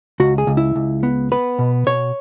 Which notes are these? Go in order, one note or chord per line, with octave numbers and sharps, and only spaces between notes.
C#2 F#4
G#4
C#2
E4
C#2
B3
B3 B4
B2
B2 C#5